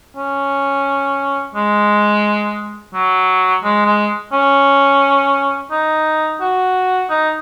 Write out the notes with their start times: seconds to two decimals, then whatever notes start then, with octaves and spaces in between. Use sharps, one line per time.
0.16 C#4
1.55 G#3
2.94 F#3
3.63 G#3
3.86 G#3
4.33 C#4
5.71 D#4
6.41 F#4
7.10 D#4